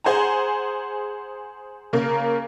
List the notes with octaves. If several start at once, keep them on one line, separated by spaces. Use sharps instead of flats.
G#4 C5 F#5 G#5 A#5
C#3 A#3 A#4